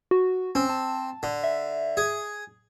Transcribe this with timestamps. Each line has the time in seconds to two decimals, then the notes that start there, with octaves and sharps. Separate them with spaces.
0.11 F#4
0.55 C4 C#4
0.70 A5
1.23 D3
1.44 E5
1.97 G#4